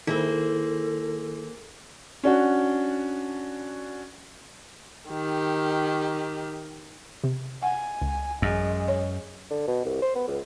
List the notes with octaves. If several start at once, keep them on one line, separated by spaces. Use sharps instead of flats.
D#3 A#3 E4 G#4 A4 C5
C#4 D4 F#4
D#3 G4
C3
F#5 G#5
C#2
A1 F#2 G#3
C#5
D3
B2
C2
C5
B3
C#2